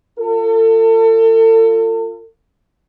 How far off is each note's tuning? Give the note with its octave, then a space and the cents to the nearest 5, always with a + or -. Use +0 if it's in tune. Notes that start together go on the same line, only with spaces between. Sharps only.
F4 -10 A4 +40